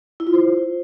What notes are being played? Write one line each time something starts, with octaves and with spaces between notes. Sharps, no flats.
E4
F4
C5